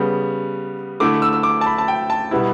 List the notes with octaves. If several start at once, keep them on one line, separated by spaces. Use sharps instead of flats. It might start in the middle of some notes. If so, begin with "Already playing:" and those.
Already playing: C#3 G3 B3
D3 A3 E4 D6
E6
E6
D6
A5
B5
A5
G5
A5
B2 G3 B3 E4